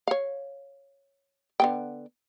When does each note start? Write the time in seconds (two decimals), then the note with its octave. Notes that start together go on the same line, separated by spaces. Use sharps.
0.08 C#5 F5
1.60 D3 B3 G5